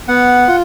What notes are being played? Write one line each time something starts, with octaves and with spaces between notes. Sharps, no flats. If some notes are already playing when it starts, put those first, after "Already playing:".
B3 F#5
F4